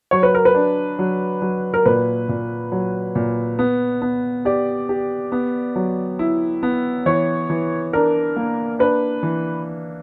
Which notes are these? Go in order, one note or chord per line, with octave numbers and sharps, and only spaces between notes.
F#3 C#5
B4
A#4
B4
D4
F#3
F#3
A#4
A#2 B4
A#2
F#3
A#2
B3
B3
G4 D5
G4
B3
F#3
E4
B3
E3 C#5
E3
D4 A#4
A#3
D4 B4
E3